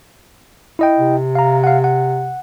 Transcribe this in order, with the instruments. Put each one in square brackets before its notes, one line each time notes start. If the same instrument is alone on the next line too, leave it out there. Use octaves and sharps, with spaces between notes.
[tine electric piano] E4 D#5 G5
[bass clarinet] C3
[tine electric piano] F5 A#5
F5 F#5
F#5